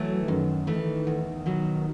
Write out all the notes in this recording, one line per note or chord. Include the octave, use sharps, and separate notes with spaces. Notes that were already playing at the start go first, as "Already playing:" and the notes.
Already playing: E3 F#3 A3
F#2 D#3
E3 A3
E2
B2 F#3